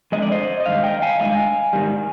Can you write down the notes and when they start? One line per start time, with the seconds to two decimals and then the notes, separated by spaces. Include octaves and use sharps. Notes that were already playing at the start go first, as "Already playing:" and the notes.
0.12 F2 D3 F3 G#3 D#5
0.22 D5
0.32 C5 D#5
0.60 D#5
0.66 G2 D#3 G#3 F5
0.84 D#5 G5
1.02 F5 G#5
1.20 G2 D#3 G#3 F5 G#5
1.73 G#2 D#3 G3